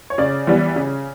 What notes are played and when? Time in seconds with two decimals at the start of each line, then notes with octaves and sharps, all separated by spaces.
0.10 C#5
0.18 C#3 D5
0.47 E3 G3 B3
0.76 C#3